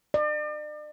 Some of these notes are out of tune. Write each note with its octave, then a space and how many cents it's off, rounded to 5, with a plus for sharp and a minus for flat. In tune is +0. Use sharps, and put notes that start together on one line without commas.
D5 +40